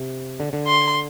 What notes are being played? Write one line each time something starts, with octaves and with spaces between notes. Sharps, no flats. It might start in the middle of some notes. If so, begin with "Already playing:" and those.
Already playing: C3
D3
D3
C6